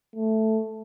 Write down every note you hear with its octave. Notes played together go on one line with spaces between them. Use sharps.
A3